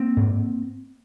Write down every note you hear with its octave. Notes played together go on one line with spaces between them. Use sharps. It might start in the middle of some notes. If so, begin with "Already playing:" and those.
Already playing: A#3 C4
G#2